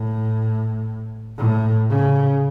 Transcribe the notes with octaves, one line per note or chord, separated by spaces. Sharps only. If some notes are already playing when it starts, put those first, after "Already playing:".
Already playing: A2
A2
C#3